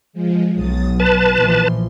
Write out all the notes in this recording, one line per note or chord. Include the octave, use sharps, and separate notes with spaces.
F3 G#3
B1 F#3 D#6 A6
B4 A5 C6
A#1 E3 F3